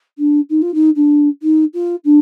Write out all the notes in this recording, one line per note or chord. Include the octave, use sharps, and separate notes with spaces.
D4
D#4
F4
D#4
D4
D#4
F4
D4